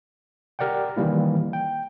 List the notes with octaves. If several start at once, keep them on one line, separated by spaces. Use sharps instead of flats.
G4 A#4 D5 F#5 G5
D#3 E3 G3 A#3 E4
G5